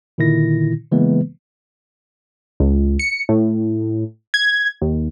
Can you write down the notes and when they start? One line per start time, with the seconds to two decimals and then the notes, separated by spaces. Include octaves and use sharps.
0.18 A#2 D3 D#3 E4 A#6
0.92 C#3 E3 G#3 A#3 B3 B4
2.60 C#2
2.99 C#7
3.29 A2
4.34 G#6
4.82 D#2